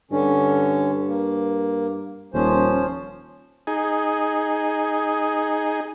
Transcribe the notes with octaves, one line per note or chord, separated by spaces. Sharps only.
G2 D3 C#4
A#3
D#1 F3 C#4 C5
D#4 G#4